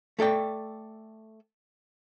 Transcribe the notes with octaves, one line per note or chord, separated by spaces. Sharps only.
A3 A4 D5 G5